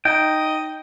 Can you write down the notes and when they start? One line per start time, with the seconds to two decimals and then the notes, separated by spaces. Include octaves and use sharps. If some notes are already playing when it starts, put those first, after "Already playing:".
0.05 D#4 D#5 G5 A#5